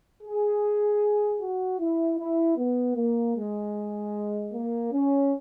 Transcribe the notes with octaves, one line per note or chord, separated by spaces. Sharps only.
G#4
F#4
E4
E4
B3
A#3
G#3
A#3
C#4